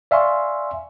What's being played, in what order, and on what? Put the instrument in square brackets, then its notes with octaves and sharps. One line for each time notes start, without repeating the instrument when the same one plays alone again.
[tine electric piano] D5 E5 F5 G#5 C6 C#6